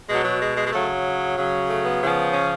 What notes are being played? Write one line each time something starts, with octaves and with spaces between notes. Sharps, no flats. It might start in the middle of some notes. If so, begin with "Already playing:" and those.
B2 F#3 G#3
F#3
G#3
G#3
G#3
C#3 F#3 A3
C#3 F#3
A3
B3
C#3 F3
C#4